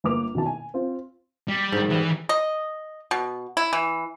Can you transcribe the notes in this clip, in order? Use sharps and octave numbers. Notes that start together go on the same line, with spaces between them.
G1 A#3 B4 D6 F7
B2 D#3 E4 A5
G#5
C4 F4
G3
G#2 D#3
E3 G3 B3
D#5
B2
E4
E3